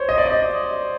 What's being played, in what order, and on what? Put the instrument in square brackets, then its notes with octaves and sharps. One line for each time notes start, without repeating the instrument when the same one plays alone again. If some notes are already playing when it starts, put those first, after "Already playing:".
Already playing: [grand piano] C5 C#5
D#5
D5
D#5